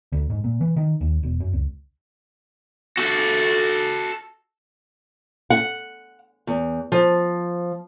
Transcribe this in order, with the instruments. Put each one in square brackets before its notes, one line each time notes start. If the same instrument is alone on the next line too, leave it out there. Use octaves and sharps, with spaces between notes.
[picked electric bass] D2
G#2
A#2
E3
D#3
D#2
E1
F#2
C#2
[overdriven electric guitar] F#4 A4
[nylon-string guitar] F#5
E2
F3